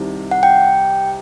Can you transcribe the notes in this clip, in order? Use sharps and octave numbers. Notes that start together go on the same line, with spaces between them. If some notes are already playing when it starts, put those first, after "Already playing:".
Already playing: C2 C3 D#3
F#5
G5